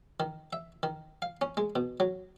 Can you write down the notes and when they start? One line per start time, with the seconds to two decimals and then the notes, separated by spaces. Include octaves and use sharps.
0.20 D#3
0.53 E5
0.83 D#3
1.22 F5
1.41 C#4
1.57 G#3
1.76 B2
2.00 F#3